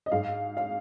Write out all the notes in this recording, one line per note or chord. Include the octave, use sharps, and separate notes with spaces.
D#5
G#2 F5
F5